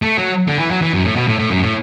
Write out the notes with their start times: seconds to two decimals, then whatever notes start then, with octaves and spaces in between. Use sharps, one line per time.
0.02 A3
0.17 F#3
0.48 D3
0.60 E3
0.71 F#3
0.82 E3
0.93 F#2
1.04 A2
1.16 B2
1.28 A2
1.39 A2
1.50 F#2
1.62 A2